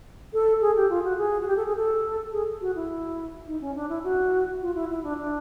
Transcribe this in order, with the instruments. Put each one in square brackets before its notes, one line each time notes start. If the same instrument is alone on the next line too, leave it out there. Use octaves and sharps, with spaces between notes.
[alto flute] A4
G#4
G4
F4
F#4
G#4
F#4
G4
A4
G#4
A4
G#4
F#4
E4
D#4
C#4
D4
E4
F#4
F4
E4
E4
D4
D4